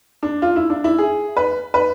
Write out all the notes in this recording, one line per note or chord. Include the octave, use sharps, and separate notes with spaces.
D4
F4
E4
D4
E4
G#4
B4
B4